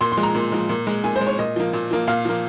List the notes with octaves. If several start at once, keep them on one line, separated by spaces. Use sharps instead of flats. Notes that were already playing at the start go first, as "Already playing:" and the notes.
A#2 C6
C6
F3 G#3
A#5
A#2
F3 G#3
A#2
G#3
A#2 G#5
C5
G#3
C#5
A#2 D#5
F3 A#3
A#2
F3 A#3
A#2 F5
F3 A#3